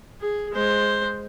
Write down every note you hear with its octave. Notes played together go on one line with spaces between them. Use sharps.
G#4
G#3 C5